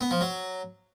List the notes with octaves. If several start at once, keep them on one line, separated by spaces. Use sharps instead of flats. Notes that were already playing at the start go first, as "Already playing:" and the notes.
B3
F3
F#3